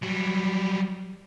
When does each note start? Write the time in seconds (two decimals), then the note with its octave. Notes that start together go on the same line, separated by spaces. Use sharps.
0.03 F#3 G3